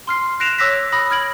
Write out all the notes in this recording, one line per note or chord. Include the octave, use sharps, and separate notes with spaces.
C6 F6 C7
F#6 A#6 C7 D7 E7 F7
C#5 D6 E6 F#6 A#6 B6
B5 D#6 A#6
F6 G#6 D7 F#7